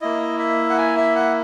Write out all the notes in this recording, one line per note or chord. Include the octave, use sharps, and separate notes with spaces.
A#3 E4 D#5
E5
F#5
G#5
E5
F#5